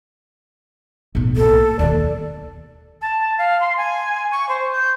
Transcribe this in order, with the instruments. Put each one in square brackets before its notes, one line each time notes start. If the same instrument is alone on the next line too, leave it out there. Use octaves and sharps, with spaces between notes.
[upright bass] B1 A2
[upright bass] A#3 [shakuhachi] A4
[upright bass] D#2 C3 [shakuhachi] D5
[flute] A5
F5
C6
G#5
C#6
C5
G6